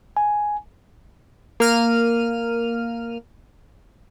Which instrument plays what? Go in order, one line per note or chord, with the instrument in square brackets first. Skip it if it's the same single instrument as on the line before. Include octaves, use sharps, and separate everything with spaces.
[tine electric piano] G#5
[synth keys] A#3 F6 D#7